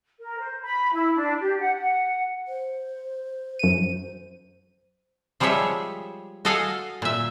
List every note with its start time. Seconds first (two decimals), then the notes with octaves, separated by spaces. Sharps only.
0.20 A#4
0.39 C5
0.62 B5
0.93 E4
1.15 D4
1.40 G4
1.59 F#5
1.74 F#5
2.48 C5
3.59 F#2 D#7
5.40 F3 G3 G#3 G#4 C#5 E5
6.45 F#4 A4 D#5 F5 F#5 G#5
7.02 A#2 E5